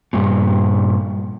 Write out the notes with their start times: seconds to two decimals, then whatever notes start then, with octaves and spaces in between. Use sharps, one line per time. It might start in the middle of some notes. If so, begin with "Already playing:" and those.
0.13 G2 A#2